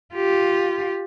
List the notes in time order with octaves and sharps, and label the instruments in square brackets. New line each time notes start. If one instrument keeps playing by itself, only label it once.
[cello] F4 G4